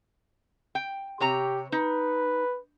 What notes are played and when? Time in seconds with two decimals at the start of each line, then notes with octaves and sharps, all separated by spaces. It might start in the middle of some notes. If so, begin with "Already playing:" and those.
0.75 G5
1.20 C3 G4 C#5 A#5
1.72 D#4 B4